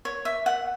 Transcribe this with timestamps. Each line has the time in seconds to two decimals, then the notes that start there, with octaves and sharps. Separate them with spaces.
0.05 C#5
0.25 E5
0.46 F#5